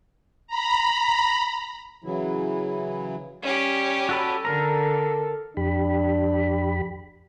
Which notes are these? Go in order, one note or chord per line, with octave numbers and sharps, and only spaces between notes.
A#5 B5
C#3 E3 F#3 E4
G3 C#4 G4
F#4 A4 B5
D3 A4 A#4 A#5
F2 D4 G4 B5